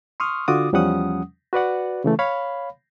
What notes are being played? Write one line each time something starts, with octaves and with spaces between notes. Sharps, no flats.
C6 C#6 D#6 F6
D3 F4 F#4 D6 D#6
E2 F3 G3 C#4 F#5 D#6
F#4 B4 D5 F#5
C#3 E3 A3
C#5 F5 B5